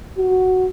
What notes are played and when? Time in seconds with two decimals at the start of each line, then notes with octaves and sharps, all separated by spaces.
0.17 F#4